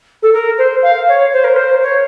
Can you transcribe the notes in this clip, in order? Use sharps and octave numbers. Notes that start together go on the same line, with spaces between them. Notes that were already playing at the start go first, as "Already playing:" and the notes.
A4
A#4
C5
F5
C#5
C5
A#4
C5
C#5